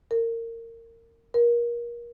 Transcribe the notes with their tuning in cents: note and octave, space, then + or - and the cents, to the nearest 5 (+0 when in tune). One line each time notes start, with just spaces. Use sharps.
A#4 -25
A#4 +25